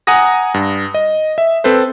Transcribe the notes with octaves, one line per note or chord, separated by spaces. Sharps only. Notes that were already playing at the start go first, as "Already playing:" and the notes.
F#5 G#5 A#5 D#6 A#6
G2
D#5
E5
C4 A4 B4 C5